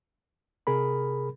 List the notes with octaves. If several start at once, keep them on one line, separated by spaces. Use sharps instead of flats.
C3 G#4 A#4 B5